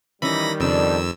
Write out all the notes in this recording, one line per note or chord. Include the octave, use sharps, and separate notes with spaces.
D#3 E3 G3 C#4 D#4 B5 A#6
F2 C#3 D4 E6